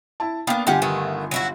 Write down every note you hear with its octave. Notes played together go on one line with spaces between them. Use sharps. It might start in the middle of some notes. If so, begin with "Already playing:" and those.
E4 A5
A#3 B3 D4 F5 G5
G1 G3 F4 G4 F#5 G#5
D#3 A3 B3
F#3 E4 F#4